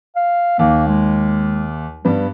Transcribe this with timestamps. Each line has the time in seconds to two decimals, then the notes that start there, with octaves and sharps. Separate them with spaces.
0.16 F5
0.59 D#2 A#3
0.88 G#3
2.05 G2 G3 B3